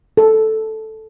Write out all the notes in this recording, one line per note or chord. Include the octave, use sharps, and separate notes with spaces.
A4